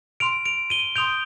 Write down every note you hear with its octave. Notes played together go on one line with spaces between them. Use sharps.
C6 F6 D7 F7
D7 F7
D#7 G7
C6 D#6 G6 D7 F7